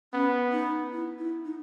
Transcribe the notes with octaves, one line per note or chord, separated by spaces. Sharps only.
B3 C#4
D#4
E4
E4
D#4